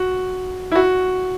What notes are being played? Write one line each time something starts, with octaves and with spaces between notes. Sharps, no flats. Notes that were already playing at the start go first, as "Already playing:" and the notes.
Already playing: F#4
E4
F#4